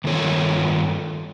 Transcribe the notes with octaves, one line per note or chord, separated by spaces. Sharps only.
G2 D#3 F4 A4 C#5